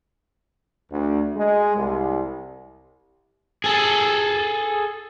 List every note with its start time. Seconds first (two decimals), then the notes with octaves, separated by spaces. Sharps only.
0.91 D2
1.36 G#3
1.76 C2
3.64 G#4 A4